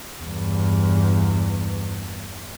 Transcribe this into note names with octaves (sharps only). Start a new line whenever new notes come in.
E2 G2